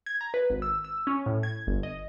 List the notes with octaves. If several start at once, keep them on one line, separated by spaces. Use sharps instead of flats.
G#6
A#5
B4
G#1
E6
E6
C#4
A2
G#6
G1
D#5